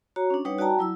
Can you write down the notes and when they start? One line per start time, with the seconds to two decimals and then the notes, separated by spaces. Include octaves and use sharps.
0.16 F#4 C#5 A#5
0.30 C#4 D4
0.45 G3 D#4 B4 C#5 F#5
0.58 F#4 D5 G5 A5 A#5
0.79 F#3 E4 E6